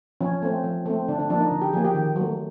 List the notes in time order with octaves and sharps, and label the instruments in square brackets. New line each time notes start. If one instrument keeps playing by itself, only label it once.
[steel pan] F3 C#4
A3 C4
F3
A3 C4
D3 D4
D4
F3 A#3 D4
D#4
D3
G4
F3 A#3 G#4
G4
D#3
F#3 A3